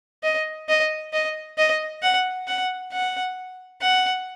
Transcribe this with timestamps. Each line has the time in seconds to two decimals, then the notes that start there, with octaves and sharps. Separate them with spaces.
0.24 D#5
0.69 D#5
1.13 D#5
1.58 D#5
2.02 F#5
2.47 F#5
2.92 F#5
3.81 F#5